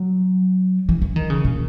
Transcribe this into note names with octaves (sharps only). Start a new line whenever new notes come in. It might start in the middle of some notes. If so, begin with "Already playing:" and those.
Already playing: F#3
E3
E3
D#3
C#3
A#2